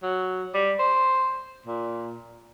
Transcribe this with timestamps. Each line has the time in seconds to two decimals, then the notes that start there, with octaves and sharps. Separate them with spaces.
0.03 F#3
0.54 G3
0.79 C5
1.66 A#2